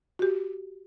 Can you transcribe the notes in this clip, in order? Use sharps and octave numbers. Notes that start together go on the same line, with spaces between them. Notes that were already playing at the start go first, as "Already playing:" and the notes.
F#4 G4